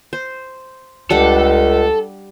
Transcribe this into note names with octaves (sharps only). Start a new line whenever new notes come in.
C5
C#2 G3 D4 A4 F#5